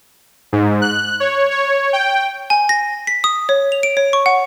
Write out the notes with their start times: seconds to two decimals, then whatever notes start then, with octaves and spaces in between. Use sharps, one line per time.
0.53 G#2
0.82 F#6
1.20 C#5
1.51 C#5
1.93 G5
2.50 G#5
2.69 A#6
3.07 B6
3.24 D#6
3.49 C#5
3.72 F7
3.83 D7
3.97 C#5
4.13 C#6
4.26 F#5